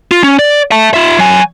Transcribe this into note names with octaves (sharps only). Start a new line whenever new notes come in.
F4
C#4
D5
E5 A5
F4 E5
F#3 G#5